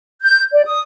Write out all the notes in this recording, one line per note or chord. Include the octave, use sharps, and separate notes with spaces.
G6
D5
D#6